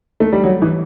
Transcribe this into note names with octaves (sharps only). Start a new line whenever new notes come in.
A3
G3
F#3
E3